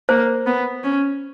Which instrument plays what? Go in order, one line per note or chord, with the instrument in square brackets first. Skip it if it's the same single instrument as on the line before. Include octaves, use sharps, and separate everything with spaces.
[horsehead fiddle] A#3 [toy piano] C5
[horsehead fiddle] B3
C#4